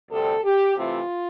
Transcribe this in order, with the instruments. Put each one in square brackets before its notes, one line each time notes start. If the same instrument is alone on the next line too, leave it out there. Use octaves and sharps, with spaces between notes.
[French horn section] D2 C3 G3 C4 A4
G4
C3 E3 A3 C4 F4